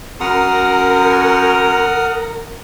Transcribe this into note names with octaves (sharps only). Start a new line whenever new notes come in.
F#2 A#4 F#5 D#6 F6